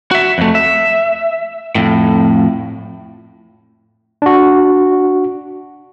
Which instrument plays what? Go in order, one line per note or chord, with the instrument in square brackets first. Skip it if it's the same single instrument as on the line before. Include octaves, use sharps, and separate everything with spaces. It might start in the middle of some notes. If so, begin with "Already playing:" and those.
[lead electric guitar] F#4 E5
F2 A3
E5
F2 A2
[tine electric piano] D4 F#4